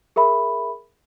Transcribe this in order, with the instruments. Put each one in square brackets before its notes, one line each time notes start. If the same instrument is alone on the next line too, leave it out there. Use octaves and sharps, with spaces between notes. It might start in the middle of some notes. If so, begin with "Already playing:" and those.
[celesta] G#4 A#4 E5 B5